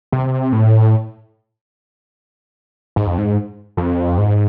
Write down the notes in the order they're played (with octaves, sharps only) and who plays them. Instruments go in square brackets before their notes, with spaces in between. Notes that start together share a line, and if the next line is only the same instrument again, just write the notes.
[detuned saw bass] C3
A2
G#2
F2
G#2
F2
G#2